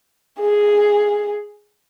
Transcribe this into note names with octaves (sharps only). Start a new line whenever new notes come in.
G#4